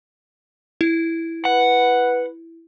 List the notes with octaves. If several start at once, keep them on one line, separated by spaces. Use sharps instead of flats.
E4
B4 F#5